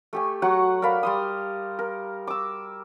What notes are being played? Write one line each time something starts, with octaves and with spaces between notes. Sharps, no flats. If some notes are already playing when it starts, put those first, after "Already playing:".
A3 G4 G#5
F#3 F#5 C#6
A#4 D5 F5 B5
G3 C6 D#6
A#4
D6 E6